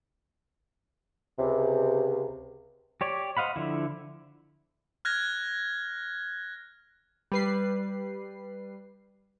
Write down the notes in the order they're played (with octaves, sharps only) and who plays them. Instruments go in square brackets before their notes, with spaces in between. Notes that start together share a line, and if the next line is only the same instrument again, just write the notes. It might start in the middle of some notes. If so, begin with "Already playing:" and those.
[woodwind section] C#2 C3
[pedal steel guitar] G4 C#5 D5
C5 D#5 F5 F#5 B5
D3 F3 E4
[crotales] F6 F#6 G#6 A#6
[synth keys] G3 B4 C7